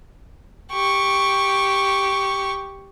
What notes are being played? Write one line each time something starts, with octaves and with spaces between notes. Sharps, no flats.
G4 C#6